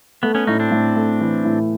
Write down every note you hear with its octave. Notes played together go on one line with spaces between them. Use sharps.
A3 B3
B3 C#4
A2 C#4 D#4
C4 D4
A2
A3
E3
A2